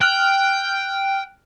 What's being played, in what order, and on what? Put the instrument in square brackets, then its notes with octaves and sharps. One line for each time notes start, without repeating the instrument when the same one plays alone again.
[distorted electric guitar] G5 [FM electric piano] F6 F#6